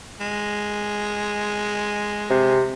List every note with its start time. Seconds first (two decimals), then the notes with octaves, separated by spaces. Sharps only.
0.20 G#3
2.30 C3